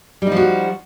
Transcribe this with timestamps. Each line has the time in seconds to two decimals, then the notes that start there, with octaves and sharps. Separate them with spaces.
0.22 G3
0.27 D#4
0.32 F3
0.37 F#4